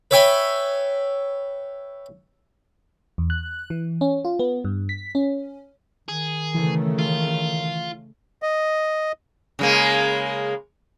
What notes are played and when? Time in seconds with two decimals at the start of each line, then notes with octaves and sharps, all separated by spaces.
0.11 B4 C#5 E5 G5 G#5 B5
3.18 E2
3.30 F#6
3.70 E3
4.01 C#4
4.25 F4
4.39 B3
4.65 G2
4.89 B6
5.15 C#4
6.08 D#3 G#4
6.54 C#3 E3 A3
6.99 F4
8.42 D#5
9.59 C#3 G#3 A#3